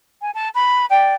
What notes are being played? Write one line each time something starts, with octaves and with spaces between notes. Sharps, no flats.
G#5
A5
B5
D5 G5